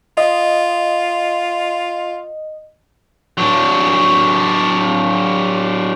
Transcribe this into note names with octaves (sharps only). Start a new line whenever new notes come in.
F4 D#5
F#3 D4